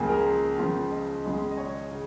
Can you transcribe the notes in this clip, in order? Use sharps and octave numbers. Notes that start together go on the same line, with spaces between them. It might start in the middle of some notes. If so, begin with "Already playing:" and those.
Already playing: C#2 C#3 F3 A#3 C#4 G#4
A#4
C#2 C#3 F3
D#5
C#2 C#3 G#3 C#4
D#5
C#5
C#3